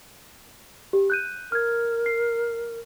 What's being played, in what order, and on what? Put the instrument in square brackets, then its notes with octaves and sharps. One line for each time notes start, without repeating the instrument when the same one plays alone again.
[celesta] G4
F#6 G6 D#7
[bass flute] A#4 [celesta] F6 G#6
[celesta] C7